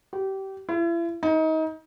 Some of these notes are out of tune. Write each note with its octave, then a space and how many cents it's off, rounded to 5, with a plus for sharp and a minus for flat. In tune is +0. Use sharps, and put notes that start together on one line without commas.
G4 -25
E4 +40
D#4 +30